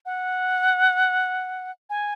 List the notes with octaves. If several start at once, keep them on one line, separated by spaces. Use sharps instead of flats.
F#5
G#5